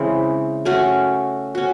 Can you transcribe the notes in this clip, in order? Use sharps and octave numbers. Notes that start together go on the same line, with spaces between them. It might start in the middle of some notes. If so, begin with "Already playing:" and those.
Already playing: C#3 E3 G#3 C4
A3 C#4 F#4
C#4 F#4